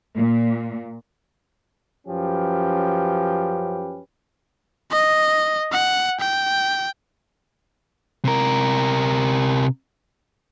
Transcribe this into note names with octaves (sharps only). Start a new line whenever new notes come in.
A#2
F#2 F3 C#4 G4 B4
D#5
F#5
G5
C3 A#4